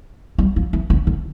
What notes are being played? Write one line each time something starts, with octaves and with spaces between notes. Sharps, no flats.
G3
F3
E3
D3
D3